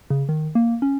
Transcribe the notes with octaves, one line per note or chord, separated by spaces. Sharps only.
C#3
D#3
A#3
C#4